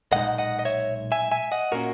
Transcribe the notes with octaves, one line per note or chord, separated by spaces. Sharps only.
B1 A#2 G#3 D#4 D#5 F#5
D#5 F#5
D#5
C#5 E5
E5 G#5
E5 G#5
D#5 F#5
A#2 A#3 C#4 F#4 A#4